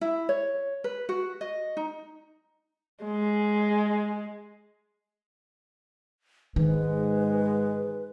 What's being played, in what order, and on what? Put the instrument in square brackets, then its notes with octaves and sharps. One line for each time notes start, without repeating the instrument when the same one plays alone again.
[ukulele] E4
C#5
B4
F#4
D#5
D#4
[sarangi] G#3
[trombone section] G#2 G#3 [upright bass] D#3 [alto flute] B4